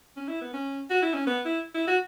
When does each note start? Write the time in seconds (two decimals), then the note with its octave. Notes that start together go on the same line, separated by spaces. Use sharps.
0.17 C#4
0.28 E4
0.41 B3
0.53 C#4
0.90 F#4
1.02 E4
1.14 C#4
1.27 B3
1.45 E4
1.75 E4
1.87 F#4